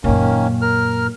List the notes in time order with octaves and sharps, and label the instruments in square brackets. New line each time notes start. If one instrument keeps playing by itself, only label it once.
[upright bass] F#2 A#2 [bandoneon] D#3 A#3 C#4
[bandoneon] A#4 F6